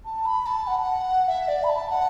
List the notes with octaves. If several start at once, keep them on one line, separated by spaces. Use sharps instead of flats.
A5
B5
A5
F#5
E5
D5
B5
A5
F#5